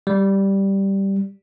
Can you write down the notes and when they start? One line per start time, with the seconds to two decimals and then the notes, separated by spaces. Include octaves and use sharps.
0.07 G3